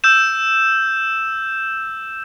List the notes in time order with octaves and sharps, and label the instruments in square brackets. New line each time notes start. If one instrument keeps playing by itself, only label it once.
[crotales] E6 G6 E7